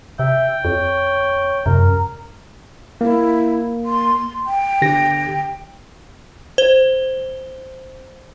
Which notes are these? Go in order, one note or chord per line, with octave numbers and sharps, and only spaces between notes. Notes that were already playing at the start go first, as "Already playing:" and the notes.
C3 E5 G5
F2 C#5
F#2 C3 A#4
A#3 E4
C6
G5
D3 G4 A#6
C5 G7